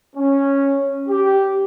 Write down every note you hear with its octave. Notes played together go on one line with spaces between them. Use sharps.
C#4
G4